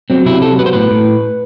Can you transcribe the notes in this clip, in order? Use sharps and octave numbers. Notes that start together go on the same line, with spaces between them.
F#3 C4
C3 E4
F#3 A4
B3 B4
C5
A2 B4
A2